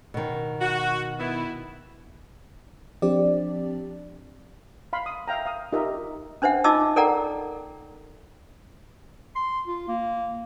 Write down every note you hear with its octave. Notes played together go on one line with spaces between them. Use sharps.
B2 D#3
F#4
B3 E4
F3 C4 D4 G4 D5
F5 B5 C6
D#6
E5 F5 G5 A#5
F5 D#6
D#4 F4 G4 A#4 D#5 E5
C#4 D4 C5 E5 F#5
D#4 F4 D#5 A5 D6 E6
A4 A#4 D5 F#5 G5 A#5
C6
F4
A#3